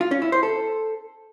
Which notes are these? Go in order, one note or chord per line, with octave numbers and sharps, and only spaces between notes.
F4
C#4
E4
C5
A4